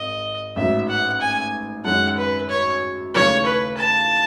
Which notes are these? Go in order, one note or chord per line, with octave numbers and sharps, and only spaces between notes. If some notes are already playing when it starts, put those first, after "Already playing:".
Already playing: G#1 D#5
A1 G#2 F#3 E5
F#5
G#5
F#2 D#3 G#3 C#4 F#4 F#5
B4
C#5
D#2 C#3 E3 A3 C#5
B4
A5